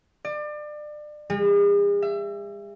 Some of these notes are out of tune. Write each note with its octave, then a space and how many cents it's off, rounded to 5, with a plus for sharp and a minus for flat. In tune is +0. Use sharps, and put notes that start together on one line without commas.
D5 +30
G#3 -45
E5 +30